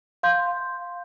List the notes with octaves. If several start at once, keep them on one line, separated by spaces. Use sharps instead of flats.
F5 C6 G6